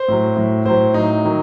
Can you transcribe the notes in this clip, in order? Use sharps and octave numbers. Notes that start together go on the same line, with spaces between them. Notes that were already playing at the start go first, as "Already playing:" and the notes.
Already playing: C5
A2 F#3
A2 F#3
A2 F#3 C5
A2 F#3 D#4
D#3 F#3